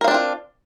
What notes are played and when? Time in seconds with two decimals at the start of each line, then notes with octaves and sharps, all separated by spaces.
0.01 A#4
0.04 F5
0.08 D4
0.11 C4
0.14 F4